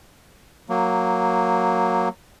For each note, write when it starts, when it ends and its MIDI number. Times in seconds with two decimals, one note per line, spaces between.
0.69 2.09 54
0.69 2.09 58